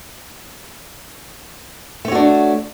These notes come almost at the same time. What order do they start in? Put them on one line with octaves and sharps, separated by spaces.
A3 C#5 F#4 D4